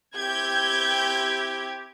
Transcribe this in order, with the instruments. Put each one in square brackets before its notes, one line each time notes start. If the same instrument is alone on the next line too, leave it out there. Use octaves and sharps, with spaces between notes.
[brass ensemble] C4 E4 G4 [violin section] G6 G#6